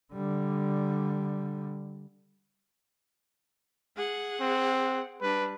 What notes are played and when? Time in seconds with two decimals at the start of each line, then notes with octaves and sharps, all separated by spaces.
0.14 D3 G3
3.97 G#4 F#5
4.41 C4
5.21 G3 D4 B4